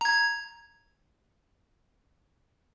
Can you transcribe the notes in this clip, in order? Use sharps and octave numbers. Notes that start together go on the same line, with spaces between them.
A#5 G#6